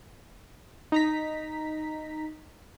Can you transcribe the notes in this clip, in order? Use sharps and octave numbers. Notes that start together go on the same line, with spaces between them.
D#4 A#5 B6